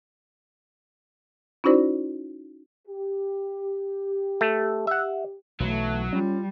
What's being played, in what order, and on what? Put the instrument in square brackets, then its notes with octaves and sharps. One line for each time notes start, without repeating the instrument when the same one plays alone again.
[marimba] C#4 D#4 E4 F#4 C5 D5
[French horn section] G4
[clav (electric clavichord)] A3
E5 F#5
[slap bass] B1 E3 [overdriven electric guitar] F#3 [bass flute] A3
[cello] G3 [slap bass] C#4 [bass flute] F4